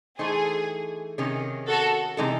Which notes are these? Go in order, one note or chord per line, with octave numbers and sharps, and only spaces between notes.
E3 A3 D#4 G#4 A4 C5
C3 D#3 C#4 G#4
F#4 A4
C3 E3 G#3 D#4 A4